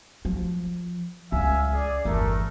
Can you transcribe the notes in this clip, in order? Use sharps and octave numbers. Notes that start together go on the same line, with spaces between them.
F3
C#2 E5 F5 G#5
G#4 D5
G1 E2 A3 A#4